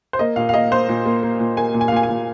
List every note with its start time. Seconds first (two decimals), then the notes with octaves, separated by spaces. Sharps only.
0.13 C5
0.19 A#3 D#5
0.36 A#2 F5
0.49 F5
0.54 A#3 D#5
0.71 A#3 C5
0.89 A#2
1.06 A#3
1.23 A#3
1.40 A#2
1.57 A#3 G#5
1.74 A#2
1.81 G#5
1.88 F5
1.92 A#2 G#5
2.03 G#5
2.09 A#2